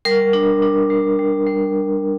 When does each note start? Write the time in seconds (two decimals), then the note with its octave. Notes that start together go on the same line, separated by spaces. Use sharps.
0.05 G3 A#4
0.33 D4
0.62 D4
0.90 G3
1.19 G3
1.47 G3